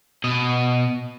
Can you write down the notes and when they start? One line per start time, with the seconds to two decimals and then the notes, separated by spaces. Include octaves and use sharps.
0.24 B2 D#5